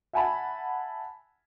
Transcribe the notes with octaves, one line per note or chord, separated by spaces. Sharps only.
E5 F#5 G#5 A5 B5